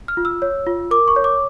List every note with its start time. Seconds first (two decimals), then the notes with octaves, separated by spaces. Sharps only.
0.08 F6
0.17 F4
0.25 E6
0.42 C#5
0.66 F4
0.91 A#4 D6
1.08 C#6
1.16 C#5
1.24 D6